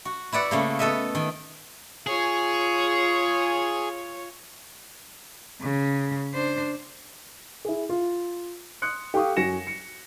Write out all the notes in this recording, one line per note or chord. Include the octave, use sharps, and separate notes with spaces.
F#4
E4 B4 D5 F#5
C#3 A3 A#3
B3 A4 B4 D#5 E5
D#3
F4 G#4 C#5
C#3
D4 C5
E4 G#4
F4
C6 D#6 F#6 C#7
G4 A4 F5 C#6 D#6
F#2 F#4 G#5 A#6 C#7 E7
C#7